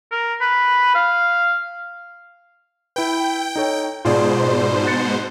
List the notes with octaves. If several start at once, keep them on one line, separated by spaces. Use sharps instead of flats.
A#4
B4
F5
E4 B4 G5
D#4 A4 C#5
G#2 B2 F4 G#4 C5 D5
F#6 A6 C#7